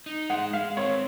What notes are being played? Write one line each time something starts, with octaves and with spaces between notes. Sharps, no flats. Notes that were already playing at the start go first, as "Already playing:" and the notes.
D#4
G#3 F#5
G#3 F5
C4 C#5